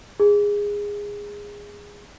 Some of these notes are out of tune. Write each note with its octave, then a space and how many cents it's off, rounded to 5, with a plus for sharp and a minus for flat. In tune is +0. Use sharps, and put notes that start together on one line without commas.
G#4 -15